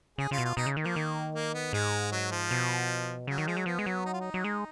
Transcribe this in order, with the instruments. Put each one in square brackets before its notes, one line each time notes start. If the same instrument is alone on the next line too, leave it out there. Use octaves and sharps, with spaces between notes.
[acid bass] C#3 [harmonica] G#4
[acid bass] C#3 [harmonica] F4
[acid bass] B2
[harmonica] F4
[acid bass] B2 [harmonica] D#4
[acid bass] C#3
D#3
[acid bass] F3 [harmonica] A#3
[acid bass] D#3
[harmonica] A#3
B3
[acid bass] G#2 [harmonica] G#3
[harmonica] F#3
F3
[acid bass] B2
[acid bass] C#3 [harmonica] F#3
[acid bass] D#3
[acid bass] F3 [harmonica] G#3
[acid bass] F#3
[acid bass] F3 [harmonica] B3
[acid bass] G#3
F#3
[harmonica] D#4
F4
D#4
[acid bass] F#3
G#3